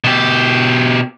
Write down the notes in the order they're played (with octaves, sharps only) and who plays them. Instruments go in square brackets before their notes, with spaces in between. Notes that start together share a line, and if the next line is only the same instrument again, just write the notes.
[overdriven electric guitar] B2 G4